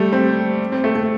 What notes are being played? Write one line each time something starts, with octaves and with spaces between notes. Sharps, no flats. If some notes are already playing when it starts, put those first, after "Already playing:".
Already playing: G3 A3
C4
C4
A3
A3